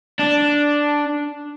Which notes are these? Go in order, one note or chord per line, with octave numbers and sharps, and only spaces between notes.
D4